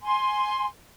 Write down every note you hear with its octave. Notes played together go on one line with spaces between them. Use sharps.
G#5 C6